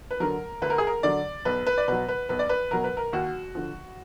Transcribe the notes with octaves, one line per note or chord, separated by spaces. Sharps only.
B4
D3 F#3 A#4
D2 B4
A#4
G#4
A#4
D3 F#3 D5
B1 B4
B4
D5
B2 F#3 B4
B4
B1 B4
D5
B4
B2 F#3 A#4
B4
A#4
D#2 F#4
D3 F3